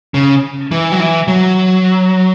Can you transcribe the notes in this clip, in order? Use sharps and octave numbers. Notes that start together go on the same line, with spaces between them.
C#3
E3
F#3
E3
F#3